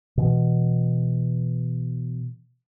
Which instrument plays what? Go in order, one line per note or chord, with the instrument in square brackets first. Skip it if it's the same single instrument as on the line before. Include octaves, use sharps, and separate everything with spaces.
[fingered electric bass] B2 E3